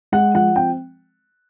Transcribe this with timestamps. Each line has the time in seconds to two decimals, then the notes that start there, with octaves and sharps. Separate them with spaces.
0.12 G#3 F#5
0.34 F3 F#5
0.56 C4 G5